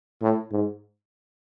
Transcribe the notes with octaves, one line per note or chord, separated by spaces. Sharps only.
A2
G#2